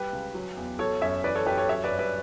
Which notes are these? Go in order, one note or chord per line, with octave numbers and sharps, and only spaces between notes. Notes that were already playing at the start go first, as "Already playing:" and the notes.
Already playing: G3 G4 B4
C#2
F#3
E2
F#3 A4 C#5
F#2 C#5 E5
E3 B4 D5
A4 C#5
F#2 G4 B4
A4 C#5
F#3 C#5 E5
B4 D5
G2
B4 D5